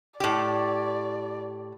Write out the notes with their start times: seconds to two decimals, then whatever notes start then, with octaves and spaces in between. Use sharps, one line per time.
0.20 A2 G4 D5